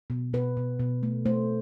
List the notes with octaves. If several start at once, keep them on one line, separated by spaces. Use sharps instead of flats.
B2
B2 B4
B2
B2
A3
A3 C5